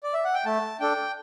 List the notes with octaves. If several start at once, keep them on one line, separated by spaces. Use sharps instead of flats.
D5
E5
F#5
G5
A3 A5
D4 A4 G5